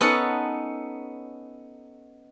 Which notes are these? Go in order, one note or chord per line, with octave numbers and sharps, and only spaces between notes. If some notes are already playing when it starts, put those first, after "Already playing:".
B3 C#4 D#4 A4 F#5